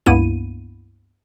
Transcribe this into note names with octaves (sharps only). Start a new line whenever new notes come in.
C#2 G2 A#3 B3 E4 D#7